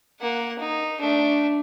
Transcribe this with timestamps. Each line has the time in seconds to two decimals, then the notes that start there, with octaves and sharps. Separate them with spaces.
0.21 A#3 F#5
0.59 D#4
1.00 A3 D4